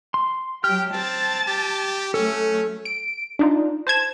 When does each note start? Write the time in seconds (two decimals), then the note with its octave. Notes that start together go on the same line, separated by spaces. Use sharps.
0.14 C6
0.64 F#3 G4 G5 F6
0.94 C4 A5 A6
1.48 G4
2.14 F#3 A3 C#4 A4
2.85 D7
3.39 D4 D#4 F4
3.87 C5 A5 G#6 E7